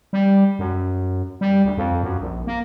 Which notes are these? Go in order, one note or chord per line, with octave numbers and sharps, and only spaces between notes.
G3
F#2
G3
D2
F2
F#2
A#1
A#3